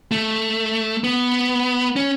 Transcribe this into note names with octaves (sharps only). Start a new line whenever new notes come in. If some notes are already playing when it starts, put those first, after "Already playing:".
A3
B3
C#4